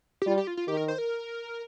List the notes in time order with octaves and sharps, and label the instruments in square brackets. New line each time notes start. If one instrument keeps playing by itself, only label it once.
[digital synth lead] G4
[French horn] G3 [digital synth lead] F4
[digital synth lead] G4
F4
F4
[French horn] D#3 [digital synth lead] G4
[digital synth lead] A#4
C5
A#4